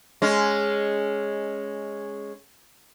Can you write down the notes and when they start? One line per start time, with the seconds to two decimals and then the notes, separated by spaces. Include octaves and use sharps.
0.22 G#3 C#4